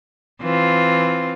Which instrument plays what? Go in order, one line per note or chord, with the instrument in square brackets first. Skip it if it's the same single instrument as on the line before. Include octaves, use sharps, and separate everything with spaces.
[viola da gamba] E3 C4 F4